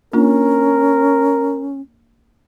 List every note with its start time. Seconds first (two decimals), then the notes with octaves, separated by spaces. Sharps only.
0.13 A#3 C#4 D4 F4 A#4